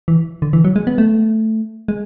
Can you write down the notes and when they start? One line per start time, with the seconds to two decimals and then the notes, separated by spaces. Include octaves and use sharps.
0.08 E3
0.42 D3
0.53 E3
0.65 F#3
0.76 G#3
0.87 B3
0.98 A3
1.88 G#3